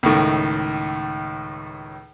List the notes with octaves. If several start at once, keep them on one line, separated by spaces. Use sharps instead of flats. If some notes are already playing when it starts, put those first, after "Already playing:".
C#2 A2 D#3